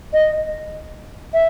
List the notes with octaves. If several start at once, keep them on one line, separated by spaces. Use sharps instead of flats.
D#5
E5